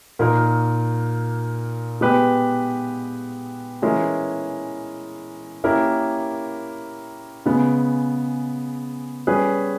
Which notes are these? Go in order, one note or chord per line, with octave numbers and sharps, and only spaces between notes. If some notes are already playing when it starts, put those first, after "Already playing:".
A#2 A#3 D#4 A#4
G#3 B3 G4 B4
E3 G#3 C#4 E4 A#4
A#3 C#4 E4 G4 A#4
C#3 G#3 B3
G3 C#4 G#4 B4